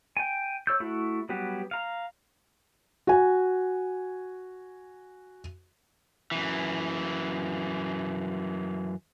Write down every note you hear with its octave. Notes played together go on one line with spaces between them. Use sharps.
G5 G#5
C#5 E6 G6
A3 E4 F#4
F#3 G3 B3 F#4 G4
F5 A#5
F#4 G#5
F#2 E3